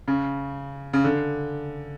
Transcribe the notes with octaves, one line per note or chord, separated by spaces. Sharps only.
C#3
C#3
D3